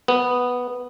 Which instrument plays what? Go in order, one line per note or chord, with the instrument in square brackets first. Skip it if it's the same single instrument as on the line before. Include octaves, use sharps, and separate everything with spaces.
[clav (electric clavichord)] B3